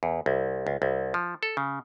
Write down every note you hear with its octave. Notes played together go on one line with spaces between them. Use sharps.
E2
C2
C#2
C2
F3
A4
C#3